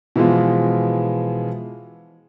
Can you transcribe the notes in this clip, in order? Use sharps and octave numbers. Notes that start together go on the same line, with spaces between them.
B2 E3 F3 G#3 F4